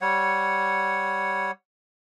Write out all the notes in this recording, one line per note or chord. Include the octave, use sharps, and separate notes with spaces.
G3 C#5 F#5